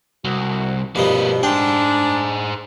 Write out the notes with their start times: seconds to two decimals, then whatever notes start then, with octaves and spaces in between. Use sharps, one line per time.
0.25 C2 F#4
0.96 G2 B2 F3 A#3 D#4 B4
1.43 D4 G#4 C5 G5